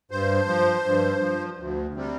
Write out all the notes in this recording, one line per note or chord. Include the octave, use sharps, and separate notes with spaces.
G2 C5
F3
G2
F3
D2
C3 G3